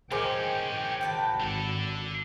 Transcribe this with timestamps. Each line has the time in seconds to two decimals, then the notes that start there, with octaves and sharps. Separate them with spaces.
0.11 E3 G#3 C#4 A#4 C5 G5 G#5 D6
1.01 F#4 B4 A5
1.40 G#1 D3 A4